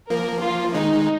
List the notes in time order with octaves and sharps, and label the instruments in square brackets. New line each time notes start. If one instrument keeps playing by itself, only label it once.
[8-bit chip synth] F3 A#3 [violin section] A#4
[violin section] F4
[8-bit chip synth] D#3 G#3 [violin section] D#4